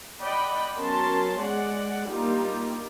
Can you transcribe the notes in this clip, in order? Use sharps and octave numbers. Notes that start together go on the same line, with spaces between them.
D5 D#5 F#5 G5 B5
F#3 B3 C#4 A#4 A5 C6
G#3 D5 F#5
G3 A#3 D4 D#4 F4 G4